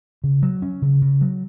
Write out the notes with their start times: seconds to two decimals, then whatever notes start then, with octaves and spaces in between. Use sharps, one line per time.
0.24 C#3
0.42 F#3
0.62 C#4
0.82 C#3
1.02 C#3
1.21 F#3